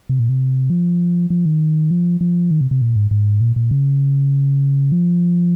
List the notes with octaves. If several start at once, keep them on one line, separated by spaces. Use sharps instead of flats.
C3
A#2
C3
F3
F3
D#3
F3
F3
D#3
C3
C3
A#2
G#2
G#2
A#2
A#2
C#3
F3